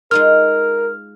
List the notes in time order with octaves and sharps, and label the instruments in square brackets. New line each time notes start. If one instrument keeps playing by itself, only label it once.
[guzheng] G#3 D#4 F4 [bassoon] A#4 [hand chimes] F6